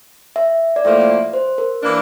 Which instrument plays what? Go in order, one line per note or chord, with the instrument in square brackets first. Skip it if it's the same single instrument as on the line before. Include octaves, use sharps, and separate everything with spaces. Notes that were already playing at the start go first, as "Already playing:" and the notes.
[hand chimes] E5
D5
[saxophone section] A2 F3 A#3 [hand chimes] E5
[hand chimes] C5
A#4
[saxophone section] E3 A#3 D4